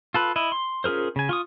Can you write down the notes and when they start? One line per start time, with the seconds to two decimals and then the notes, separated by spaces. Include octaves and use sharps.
0.14 F4 A4 B4
0.36 E4 D#5
0.52 C6
0.84 C#4 F4 G#4 A#4 C5
1.16 C#3 G#5
1.29 F4 C#6 D#6